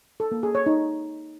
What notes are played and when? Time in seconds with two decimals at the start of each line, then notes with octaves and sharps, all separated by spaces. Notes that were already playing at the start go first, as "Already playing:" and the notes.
0.20 A4
0.31 A#3
0.43 G#4
0.55 C#5
0.66 D#4